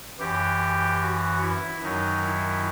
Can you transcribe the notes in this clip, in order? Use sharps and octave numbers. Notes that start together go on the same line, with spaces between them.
F#2 E3 G4
F#4
E4
F#2 D#3 F#3 D#4
E4